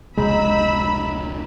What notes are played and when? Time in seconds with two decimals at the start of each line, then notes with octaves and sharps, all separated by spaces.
0.18 F1 C#2 F#3 G#3 D#4 B5 E6